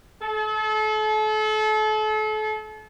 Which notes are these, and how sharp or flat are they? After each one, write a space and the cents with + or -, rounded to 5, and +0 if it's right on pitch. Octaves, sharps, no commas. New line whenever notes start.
A4 -35